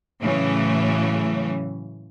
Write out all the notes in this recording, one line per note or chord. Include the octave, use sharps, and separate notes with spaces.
A2 C#3 E3 F#3 C#4